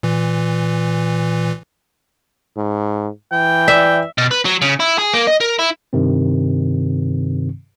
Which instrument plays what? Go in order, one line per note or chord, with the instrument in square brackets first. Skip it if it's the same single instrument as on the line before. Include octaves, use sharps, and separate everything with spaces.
[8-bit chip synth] A#2 E3
[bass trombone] G#2
[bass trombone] E3 [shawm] G5
[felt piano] D5 [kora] E5
[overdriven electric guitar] B2
B4
F#3
C#3
E4
G#4
A#3
D#5
A#4
E4
[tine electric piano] G2 C3 D#3 C4